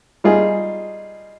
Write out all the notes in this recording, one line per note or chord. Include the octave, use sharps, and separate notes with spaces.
G3 D#4 F4 G#4